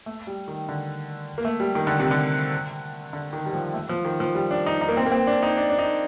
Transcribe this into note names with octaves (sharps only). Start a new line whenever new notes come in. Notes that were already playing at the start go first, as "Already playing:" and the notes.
A3
G3
D#3
D3
A#3
A3
G3
D#3
D3
C3
D3
D3
D#3
G3
F3
A3
F3
D#3
F3
G3
D4
D#4
D#4
A#3
C4
A#3
C4
D4
D#4
D4
D4
D#4